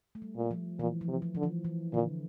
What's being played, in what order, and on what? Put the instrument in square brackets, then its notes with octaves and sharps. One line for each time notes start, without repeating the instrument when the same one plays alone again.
[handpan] A3
G3
[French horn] A#2
[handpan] F3
[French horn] A#2 [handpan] E3
[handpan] F3
[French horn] C3
[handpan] F3
[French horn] D3 [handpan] F3
[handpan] E3
E3
[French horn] A#2 [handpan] D3